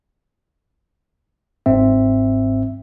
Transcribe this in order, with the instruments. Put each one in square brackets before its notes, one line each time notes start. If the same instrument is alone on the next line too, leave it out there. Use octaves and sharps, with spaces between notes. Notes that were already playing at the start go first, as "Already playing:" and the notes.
[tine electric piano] G1 G#2 C4 E5